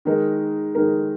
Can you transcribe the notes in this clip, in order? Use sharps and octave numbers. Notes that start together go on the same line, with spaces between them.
D#3 G#3 D#4 A#4
D#3 G#3 D#4 A#4